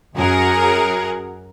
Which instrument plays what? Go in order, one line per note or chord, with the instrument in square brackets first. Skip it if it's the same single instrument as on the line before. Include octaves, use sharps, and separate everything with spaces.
[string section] F#2 G#4 A#4 F#5